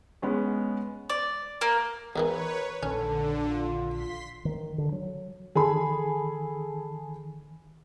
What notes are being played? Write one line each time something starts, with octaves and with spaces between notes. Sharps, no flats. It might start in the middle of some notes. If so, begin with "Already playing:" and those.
G#3 B3 C#4
D5
A#3
E2 D#3 E3 A#4 B4 C#5
A#1 D3 D#3 C#4 A4
F4
C6 B6
D#3
D3
F#3
D#3 G#4 A4 B5